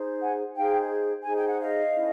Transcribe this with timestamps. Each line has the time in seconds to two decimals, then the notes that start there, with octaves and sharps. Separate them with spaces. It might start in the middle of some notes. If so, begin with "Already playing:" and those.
Already playing: D#4 G#4 C5
0.21 F#5 G#5
0.56 D#4 G#4 C5 F5 G5
1.24 D#4 G#4 C5 G#5
1.36 G5
1.48 F#5
1.60 D#5 F5
1.95 C#4 E4 A4